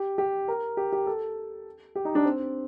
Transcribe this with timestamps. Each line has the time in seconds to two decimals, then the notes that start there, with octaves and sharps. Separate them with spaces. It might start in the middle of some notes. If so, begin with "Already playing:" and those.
Already playing: G4
0.18 G4
0.48 A#4
0.77 G4
0.92 G4
1.07 A4
1.95 G4
2.05 D#4
2.15 D4
2.25 C4